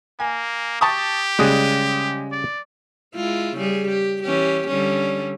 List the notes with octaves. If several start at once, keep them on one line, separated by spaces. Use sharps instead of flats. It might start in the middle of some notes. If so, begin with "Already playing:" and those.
A#3 G#5
G4 A5 C#6 D#6
C#3 G3 G#3 D#6 F#6
D5
G#3 E4 F4
C#3 G3 G#4
G4
E3 C#4 G4
D3 G3 C#4